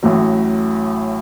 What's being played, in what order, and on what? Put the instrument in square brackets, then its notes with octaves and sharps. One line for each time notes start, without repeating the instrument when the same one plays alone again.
[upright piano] A1 A2 F#3